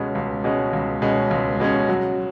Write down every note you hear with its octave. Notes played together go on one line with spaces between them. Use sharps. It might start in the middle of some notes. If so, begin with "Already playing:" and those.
Already playing: C#2 B2 G#3 C#4
C#2
B2 G#3 C#4
C#2
B2 G#3 C#4
C#2
B2 G#3 C#4
F#3